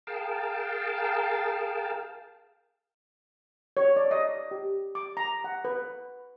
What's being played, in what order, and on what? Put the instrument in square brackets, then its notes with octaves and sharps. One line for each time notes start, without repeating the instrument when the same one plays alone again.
[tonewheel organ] G#4 A#4 F5 G5 A5
[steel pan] C#5
D5
D#5
G4
D6
A#5
F#5
B4